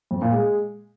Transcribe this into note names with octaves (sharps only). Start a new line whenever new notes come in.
F2
A#2
G#3